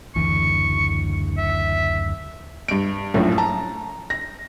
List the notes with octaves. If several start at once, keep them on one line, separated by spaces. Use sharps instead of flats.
F#1 D2 E3 C#6
E5
G2 D7
A#1 F#2 A2 F3
A5 A#5
A#6